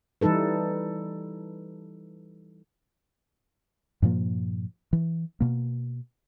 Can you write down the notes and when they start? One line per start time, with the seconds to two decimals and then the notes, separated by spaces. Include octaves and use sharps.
0.21 E3 G3 D#4 A4 B4
4.02 G2 A#2 F3 A#3
4.93 E3
5.40 B2 A#3